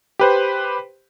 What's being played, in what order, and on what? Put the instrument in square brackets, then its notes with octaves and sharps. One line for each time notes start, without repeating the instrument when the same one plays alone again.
[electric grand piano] G4 B4 C5